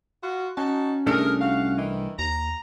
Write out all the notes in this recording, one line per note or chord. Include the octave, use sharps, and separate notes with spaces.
F4 F#4
C#4 D#4 F#4 A5
C2 A3 D4 G#4 A#4
F#4 F5
D#3 E3
D#2 A#5